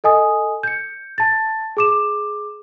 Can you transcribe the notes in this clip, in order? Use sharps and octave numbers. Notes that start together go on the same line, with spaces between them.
A4 D#5 G#5 D#6
G6 C#7
A5 A6
G#4 D6 E7